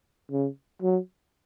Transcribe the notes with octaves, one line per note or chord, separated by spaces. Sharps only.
C#3
F#3